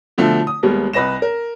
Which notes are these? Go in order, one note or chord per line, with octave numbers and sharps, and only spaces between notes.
B2 D3 F3 A3
D#6
D#2 G3 G#3 A#3 B3
C2 B4 D#5 A#6 E7
A#4